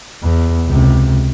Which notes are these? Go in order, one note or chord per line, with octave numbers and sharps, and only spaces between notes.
E2
C#2 C3